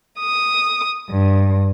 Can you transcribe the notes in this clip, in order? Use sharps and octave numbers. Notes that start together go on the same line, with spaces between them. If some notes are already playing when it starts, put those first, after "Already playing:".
D#6
G2